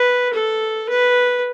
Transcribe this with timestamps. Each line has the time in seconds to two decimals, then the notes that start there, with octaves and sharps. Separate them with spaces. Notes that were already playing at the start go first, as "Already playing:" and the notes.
Already playing: B4
0.34 A4
0.90 B4